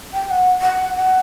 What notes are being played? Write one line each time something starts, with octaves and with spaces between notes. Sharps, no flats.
G5
G5
F#5
F#5
F#5